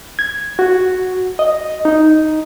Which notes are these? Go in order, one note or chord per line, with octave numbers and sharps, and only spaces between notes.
G#6
F#4
D#5
D#4